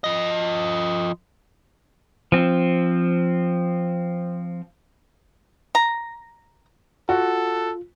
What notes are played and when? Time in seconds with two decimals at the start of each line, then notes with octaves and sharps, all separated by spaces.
0.04 F3 D#5
2.32 F3 C4
5.75 A#5
7.09 F4 F#4 A4